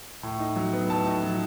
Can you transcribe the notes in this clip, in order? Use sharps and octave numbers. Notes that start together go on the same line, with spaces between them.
A2
D#4
F#3
B3
A2 A5
D#4
F#3